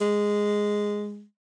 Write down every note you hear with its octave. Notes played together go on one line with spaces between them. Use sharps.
G#3